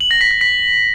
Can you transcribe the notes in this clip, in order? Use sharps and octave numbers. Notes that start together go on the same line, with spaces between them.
F#7
A#6
B6
A#6
B6